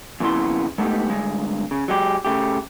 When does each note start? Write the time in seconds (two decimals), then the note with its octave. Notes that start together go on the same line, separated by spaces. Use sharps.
0.20 F2 A#2 C#3 B3 E4 C6
0.78 G#3 A3 B3 D#4 G4
1.10 D2 G2 G#3
1.71 C#3
1.88 F#3 G#3 G4
2.25 C#3 A3 G4